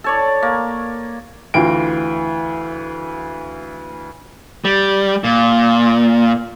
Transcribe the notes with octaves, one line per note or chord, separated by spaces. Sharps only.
A4 C#5 D5
A#3
D2 E3 F4 G5 D7
G3
A#2